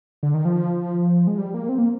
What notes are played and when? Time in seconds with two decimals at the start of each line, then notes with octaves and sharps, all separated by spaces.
0.23 D3
0.34 D#3
0.45 F3
1.27 G#3
1.38 G3
1.54 A#3
1.69 C4
1.78 A#3